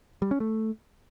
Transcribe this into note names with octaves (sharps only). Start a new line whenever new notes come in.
G3
C#4
A3